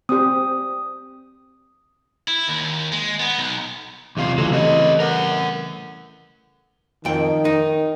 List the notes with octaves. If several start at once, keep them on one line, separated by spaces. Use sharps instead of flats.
C4 G4 D#6
E4
D#2
G#3
B3
B1
E2 C3 F4
C#3 E3 F#3 A3 A4
E3 C4 C#4 G4 D#5
A#4 F#5
F2 D#3 G5
D#4